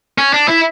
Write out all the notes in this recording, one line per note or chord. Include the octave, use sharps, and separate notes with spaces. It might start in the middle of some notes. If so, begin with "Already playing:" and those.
C#4
D4
E4